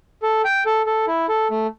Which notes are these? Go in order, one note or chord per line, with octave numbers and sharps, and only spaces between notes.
A4
G5
A4
A4
E4
A4
A3